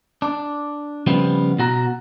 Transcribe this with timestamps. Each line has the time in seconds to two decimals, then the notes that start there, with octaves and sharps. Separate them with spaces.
0.22 D4
1.07 C#3 F3 G3 B3 C4
1.59 B2 F#4 A#5